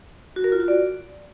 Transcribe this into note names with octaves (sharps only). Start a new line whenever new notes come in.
F#4
A#4
F4
F#4
D5